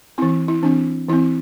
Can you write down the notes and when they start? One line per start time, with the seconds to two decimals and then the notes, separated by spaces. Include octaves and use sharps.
0.18 E3 C4 E4
0.48 E4
0.63 E3 C4 D4
1.09 E3 C4 E4